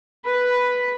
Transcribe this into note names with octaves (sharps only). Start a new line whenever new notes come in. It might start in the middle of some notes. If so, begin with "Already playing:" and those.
B4 B5